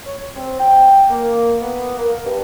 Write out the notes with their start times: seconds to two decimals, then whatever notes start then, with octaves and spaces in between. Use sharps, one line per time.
0.06 C#5
0.35 C4
0.59 G5
1.09 A#3
1.61 B3
1.98 A#3
2.25 G2